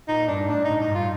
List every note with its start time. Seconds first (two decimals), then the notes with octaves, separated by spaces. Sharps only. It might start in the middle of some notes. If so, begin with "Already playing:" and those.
0.08 A#2 D#4
0.28 G2 D4
0.49 A2 D4
0.65 D#4
0.70 A2
0.80 A2 D#4
0.91 G2 F4